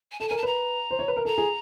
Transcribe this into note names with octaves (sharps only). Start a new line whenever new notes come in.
G#5
A4 A5
A#4 G#5
A5
B4 A#5
C5
C#5
B4
A#4
A4 A#5
G#4